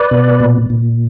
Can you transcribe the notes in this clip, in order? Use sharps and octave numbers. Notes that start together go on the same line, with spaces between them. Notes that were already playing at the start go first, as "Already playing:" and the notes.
Already playing: B4 D5
B2
A#2
A#2